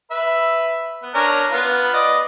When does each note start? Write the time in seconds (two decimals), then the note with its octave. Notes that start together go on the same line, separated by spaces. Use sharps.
0.11 B4 E5
1.03 B3
1.14 C#4 D4 A#4
1.51 B3 F4 B4
1.94 D5 D#5